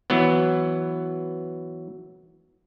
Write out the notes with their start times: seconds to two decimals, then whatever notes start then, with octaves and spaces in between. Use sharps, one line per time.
0.10 E3 F#3 B3